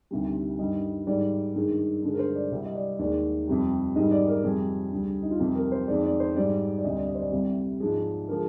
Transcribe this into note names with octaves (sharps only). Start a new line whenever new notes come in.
D2 C3 D#3 G3
G2 D#3 G3 D#5
G#2 D#3 G3 D5
G2 D#3 G#3
G2 D3 G#3
A#4
C5
D5
C2 C3 G3
D#5
D5
D#2 D#3 G#3 D5
F2 C3 G3
G#2 D#3 G3 D#5
D5
A#4
F2 C3 G3 G#4
D2 D3 G3
D#4
F4
F2 C3 G3 G4
A#4
C5
F2 D#3 G#3 D5
D5
C5
G#2 G3 D5
D5
D2 C3 G3 D#5
D5
D#5
C5
D5
C2 C3 G3
G#2 F3 G#3
D3 F3 G#3 A#4